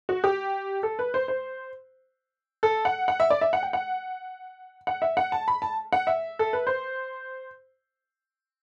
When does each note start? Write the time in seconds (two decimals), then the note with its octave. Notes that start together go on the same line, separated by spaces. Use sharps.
0.09 F#4
0.24 G4
0.83 A4
0.99 B4
1.14 C5
1.28 C5
2.63 A4
2.85 F#5
3.08 F#5
3.20 E5
3.30 D5
3.41 E5
3.53 F#5
3.63 G5
3.73 F#5
4.87 F#5
5.02 E5
5.17 F#5
5.32 A5
5.48 B5
5.62 A5
5.93 F#5
6.07 E5
6.39 A4
6.53 B4
6.67 C5